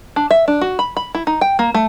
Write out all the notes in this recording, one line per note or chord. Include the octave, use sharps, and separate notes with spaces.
D4
E5
D4
F#4
B5
B5
E4
D#4
G5
A#3
A3